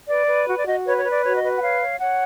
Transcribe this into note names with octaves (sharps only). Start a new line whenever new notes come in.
B4 D5
B4
F#4
D5
F#4 D#5
B4 C#5
C#5
B4
D5
F#4 C#5
D#5
B4
F#5
C#5 F5
C#5
C#5 F#5